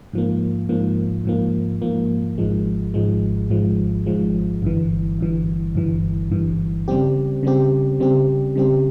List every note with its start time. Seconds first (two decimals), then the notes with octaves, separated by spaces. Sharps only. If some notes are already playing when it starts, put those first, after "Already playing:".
0.13 G#2 F3 A#3
0.69 G#2 F3 A#3
1.25 G#2 F3 A#3
1.82 G#2 F3 A#3
2.38 G#1 G#2 F3 G#3
2.94 G#1 G#2 F3 G#3
3.50 G#1 G#2 F3 G#3
4.06 G#1 G#2 F3 G#3
4.62 G1 G2 E3
5.19 G1 G2 E3
5.75 G1 G2 E3
6.31 G1 G2 E3
6.88 C#3 G3 C4 G4
7.43 C#3 G3 C4 G4
8.00 C#3 G3 C4 G4
8.56 C#3 G3 C4 G4